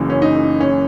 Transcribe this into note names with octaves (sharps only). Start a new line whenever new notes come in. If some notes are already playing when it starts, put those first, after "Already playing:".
Already playing: F#1 F#2 C#3 E3
C#4
D#4
C#4